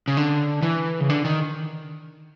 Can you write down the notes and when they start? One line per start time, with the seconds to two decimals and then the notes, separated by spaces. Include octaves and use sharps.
0.08 C#3
0.17 D3
0.62 E3
1.00 C#3
1.10 D3
1.25 D#3